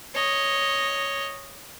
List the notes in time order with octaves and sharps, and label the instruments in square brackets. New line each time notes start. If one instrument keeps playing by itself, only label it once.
[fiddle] C#5 D#5